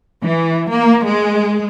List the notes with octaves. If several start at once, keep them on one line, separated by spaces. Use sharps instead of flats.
E3
A#3
G#3